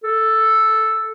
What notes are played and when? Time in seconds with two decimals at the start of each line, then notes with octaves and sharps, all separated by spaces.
0.03 A4